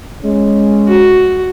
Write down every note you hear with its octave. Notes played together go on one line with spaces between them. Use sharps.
G#3 C#4
F#4